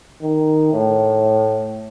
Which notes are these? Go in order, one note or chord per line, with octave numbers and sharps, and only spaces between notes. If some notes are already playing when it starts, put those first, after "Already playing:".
D#3
A2